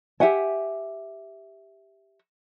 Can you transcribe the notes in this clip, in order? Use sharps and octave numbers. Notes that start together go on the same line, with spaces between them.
G4 E5 F#5 G#5